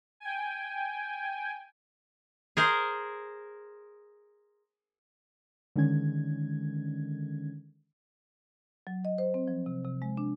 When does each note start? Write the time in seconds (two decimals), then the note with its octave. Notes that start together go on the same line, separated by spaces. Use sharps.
0.20 G5 G#5
2.57 G#4 A#4 C5
5.76 D3 D#3 G#3 C#4 G#6
8.87 F#3
9.05 D#5
9.18 C5
9.34 C4
9.48 F3
9.66 C3
9.84 C3
10.02 G#3
10.17 D4